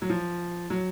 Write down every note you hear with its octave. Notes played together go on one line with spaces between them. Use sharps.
F#3
F3
F#3